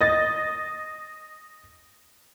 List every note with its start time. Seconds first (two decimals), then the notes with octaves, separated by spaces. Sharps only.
0.01 D#5 A6